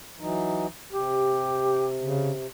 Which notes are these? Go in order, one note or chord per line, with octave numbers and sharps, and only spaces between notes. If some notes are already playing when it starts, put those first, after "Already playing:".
E3 F#3 D#4
C3 G4
C#3